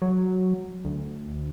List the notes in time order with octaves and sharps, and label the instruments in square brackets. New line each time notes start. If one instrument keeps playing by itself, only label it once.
[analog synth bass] F#3
D2